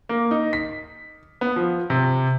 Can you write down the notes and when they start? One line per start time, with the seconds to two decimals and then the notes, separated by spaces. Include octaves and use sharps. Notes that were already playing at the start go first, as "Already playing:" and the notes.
0.09 A#3
0.31 D#4
0.53 B6
1.41 B3
1.56 F3
1.90 C3